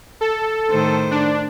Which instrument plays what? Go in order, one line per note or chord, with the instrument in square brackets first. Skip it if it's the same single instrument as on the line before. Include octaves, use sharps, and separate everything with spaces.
[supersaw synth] A4
[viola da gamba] A2 D#3 C5
[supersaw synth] D4